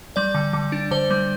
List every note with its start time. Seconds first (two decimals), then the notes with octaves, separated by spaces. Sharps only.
0.16 G3 D5
0.34 D3
0.53 D3
0.72 D4
0.91 D3 C5
1.10 G3